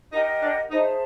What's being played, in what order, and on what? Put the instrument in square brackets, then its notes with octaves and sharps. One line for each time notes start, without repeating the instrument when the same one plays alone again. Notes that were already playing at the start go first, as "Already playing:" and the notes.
[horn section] D#4 [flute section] G4 A#4 D#5 F#5
[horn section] D4
[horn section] D#4 [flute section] G#4 C5 E5 A5